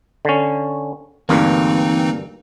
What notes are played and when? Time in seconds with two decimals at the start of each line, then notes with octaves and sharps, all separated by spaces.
0.25 D3 C#4
1.29 D2 G2 E3 A#3 C4 D#4